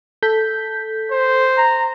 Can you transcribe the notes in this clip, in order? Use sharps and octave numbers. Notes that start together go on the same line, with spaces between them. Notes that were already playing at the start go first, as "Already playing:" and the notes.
A4 G6 B6
C5
A#5